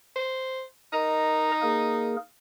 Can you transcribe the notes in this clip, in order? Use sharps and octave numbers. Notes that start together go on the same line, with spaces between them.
C5
D#4 A#4 D#5 A#5
A#3 G#4 A#4